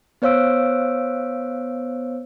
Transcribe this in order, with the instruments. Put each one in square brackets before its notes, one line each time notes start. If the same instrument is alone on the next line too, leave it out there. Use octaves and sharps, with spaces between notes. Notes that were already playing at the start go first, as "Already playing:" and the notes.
[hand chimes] B3 C5 C#5 F5 E6 D7